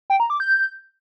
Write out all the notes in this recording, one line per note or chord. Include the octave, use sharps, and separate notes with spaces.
G5
A#5
D6
G6